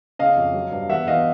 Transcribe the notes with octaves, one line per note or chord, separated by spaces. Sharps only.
C#3 D#5 F5
F2
F#3
G2
E2 E5 F#5
E2 D#5 F5